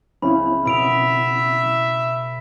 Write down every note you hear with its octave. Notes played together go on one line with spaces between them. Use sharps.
C#2 C4 C#4 E4 B5
B2 E5 B5 D7 F7